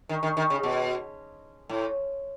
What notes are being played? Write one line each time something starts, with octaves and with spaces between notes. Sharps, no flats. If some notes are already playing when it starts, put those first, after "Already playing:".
D#3
D#3
D#3
C#3
B2
A2